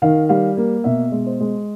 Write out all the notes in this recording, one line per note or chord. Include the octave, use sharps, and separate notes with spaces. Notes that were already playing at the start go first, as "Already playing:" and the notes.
D#3 F5
G3 F5
A#3
B2 E5
G#3
C5
G#3